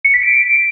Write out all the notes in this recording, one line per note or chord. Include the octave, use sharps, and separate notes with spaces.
C#7
B6
D7